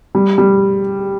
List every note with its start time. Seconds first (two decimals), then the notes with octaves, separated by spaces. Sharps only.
0.15 G3
0.38 G3